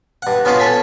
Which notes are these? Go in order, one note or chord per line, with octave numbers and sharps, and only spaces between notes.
G2 F#5
B3 C#4 F4 F#4 D#5 F5
C#4 A4 G#5 B5